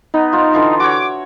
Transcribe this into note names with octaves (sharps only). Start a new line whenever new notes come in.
B3 D#4
F4 C5
D3 E3 F4
F#4 C#5 D6